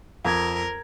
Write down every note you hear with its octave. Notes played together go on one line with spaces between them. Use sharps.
F2 A#4 G#6